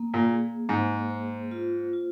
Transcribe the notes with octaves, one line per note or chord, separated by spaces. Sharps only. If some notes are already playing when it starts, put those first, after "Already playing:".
Already playing: A#3
A#2
G#4
G#2 C5
C5
F4
F4